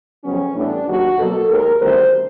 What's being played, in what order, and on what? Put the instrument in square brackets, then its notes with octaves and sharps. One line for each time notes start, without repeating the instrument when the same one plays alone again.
[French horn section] F2 C#3 F#3 B3 C#4
A2 E3 G3 B3 D4
D#2 C#3 F#3 A#3 F#4
B2 F#3 A#3 A4
D#2 D#3 G#3 A#4
D2 C3 D#3 G3 B3 C5